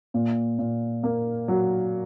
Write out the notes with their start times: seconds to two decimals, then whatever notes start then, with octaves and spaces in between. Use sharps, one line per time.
0.14 A#2
0.59 A#2
1.03 A#3
1.48 F#3